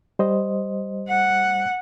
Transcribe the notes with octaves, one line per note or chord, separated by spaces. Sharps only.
G3 C5 D#5
F#5